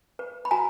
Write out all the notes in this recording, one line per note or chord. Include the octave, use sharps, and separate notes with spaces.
B4
B5
F#4 G#5 A#5